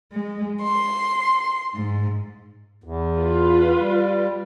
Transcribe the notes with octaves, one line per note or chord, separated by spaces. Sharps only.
G#3
C6
G#2
E2
F4 B4
G3